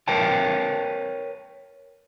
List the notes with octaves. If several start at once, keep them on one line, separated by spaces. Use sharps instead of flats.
A#4 B4 C#5 G5 A5